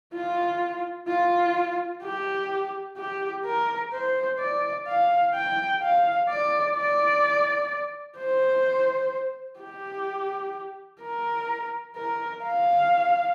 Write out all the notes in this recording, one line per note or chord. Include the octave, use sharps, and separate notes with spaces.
F4
F4
G4
G4
A#4
C5
D5
F5
G5
F5
D5
D5
C5
G4
A#4
A#4
F5